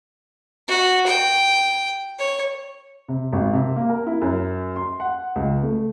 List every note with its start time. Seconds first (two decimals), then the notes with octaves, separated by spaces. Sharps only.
0.68 F#4
1.06 G5
2.19 C#5
3.08 C3
3.33 G#1
3.53 C3
3.76 A#3
3.90 A#4
4.07 E4
4.22 F#2
4.76 C6
5.00 F#5
5.36 C#2
5.63 A3